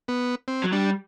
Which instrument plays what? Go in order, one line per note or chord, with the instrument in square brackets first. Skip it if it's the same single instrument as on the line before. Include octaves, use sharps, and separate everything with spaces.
[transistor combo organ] B3
C4
[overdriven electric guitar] F#3
[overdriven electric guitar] G3 [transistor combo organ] D4